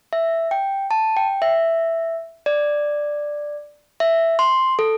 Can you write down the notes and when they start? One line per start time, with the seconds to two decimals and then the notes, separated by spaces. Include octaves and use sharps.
0.13 E5
0.51 G5
0.91 A5
1.17 G5
1.42 E5
2.46 D5
4.00 E5
4.39 C6
4.79 A4